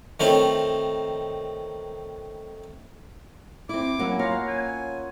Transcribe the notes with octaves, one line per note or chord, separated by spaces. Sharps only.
D#3 A3 C4 F4 C#5 B5
C4 E4 D6
F#3 A#3 C#4 E4 G#5
A#3 F4 F#4 C#5 F5 A#5
G#5